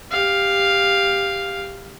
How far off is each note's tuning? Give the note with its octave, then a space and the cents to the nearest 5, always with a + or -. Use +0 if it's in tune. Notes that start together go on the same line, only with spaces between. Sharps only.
G4 +15 F5 +0